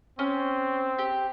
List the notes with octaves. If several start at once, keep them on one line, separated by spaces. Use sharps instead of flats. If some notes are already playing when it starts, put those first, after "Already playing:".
C4 C#4
G4